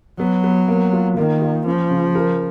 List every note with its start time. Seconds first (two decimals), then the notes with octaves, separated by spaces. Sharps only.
0.19 F#3 B3
0.44 B3
0.68 A#3
0.93 F4
1.17 D#3 A#3
1.42 F4
1.66 F3 C#4
1.91 C#3
2.15 A#4